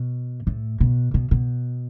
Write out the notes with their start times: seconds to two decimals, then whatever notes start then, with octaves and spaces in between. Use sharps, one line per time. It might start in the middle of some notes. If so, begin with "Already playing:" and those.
Already playing: B2
0.47 A2
0.80 B2
1.14 B2
1.31 B2